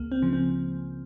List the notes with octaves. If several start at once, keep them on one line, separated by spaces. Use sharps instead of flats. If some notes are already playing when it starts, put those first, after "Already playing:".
Already playing: C#2 A#3
C4
C#3 F3
C4